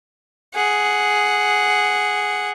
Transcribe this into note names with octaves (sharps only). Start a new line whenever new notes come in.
G#4 F#5